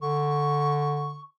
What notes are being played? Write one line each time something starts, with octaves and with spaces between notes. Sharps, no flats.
D3 C#6